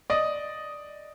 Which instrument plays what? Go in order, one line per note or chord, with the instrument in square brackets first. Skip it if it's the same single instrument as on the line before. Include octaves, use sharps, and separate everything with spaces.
[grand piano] D5 D#5